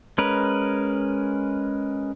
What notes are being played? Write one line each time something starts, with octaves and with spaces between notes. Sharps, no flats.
G#3 C#4 A#4 B4